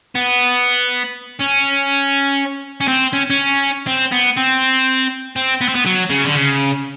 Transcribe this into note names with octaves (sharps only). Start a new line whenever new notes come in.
B3
C#4
C#4
C4
C#4
C#4
C4
B3
C4
C4
B3
C4
B3
F#3
C#3
D3
C#3